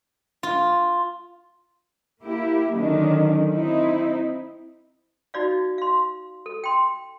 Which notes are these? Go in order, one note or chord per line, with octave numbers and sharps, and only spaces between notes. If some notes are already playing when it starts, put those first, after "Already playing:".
F4
A#3 E4 G4
D3 D#3 F#3 C#4 D4
C4 D#4 E4
D#4 F#4 D5 F5
F5 C6
A4
G5 C6